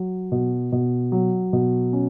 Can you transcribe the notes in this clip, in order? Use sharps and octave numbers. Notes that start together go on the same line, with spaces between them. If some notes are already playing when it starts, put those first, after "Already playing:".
Already playing: F#3
B2
B2
F#3
B2
C#4